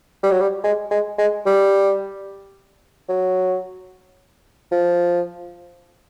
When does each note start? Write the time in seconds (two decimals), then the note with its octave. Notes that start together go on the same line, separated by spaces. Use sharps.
0.23 G3
0.31 F#3
0.40 G3
0.64 G#3
0.91 G#3
1.18 G#3
1.46 G3
3.09 F#3
4.72 F3